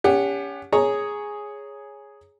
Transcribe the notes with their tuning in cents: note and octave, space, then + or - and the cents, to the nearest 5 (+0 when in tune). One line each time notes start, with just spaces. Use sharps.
C#4 +30 G4 +35 F#5 +0
G#4 +0 C#5 +0 A#5 +0